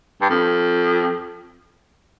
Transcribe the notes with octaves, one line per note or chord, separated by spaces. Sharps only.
G2
F2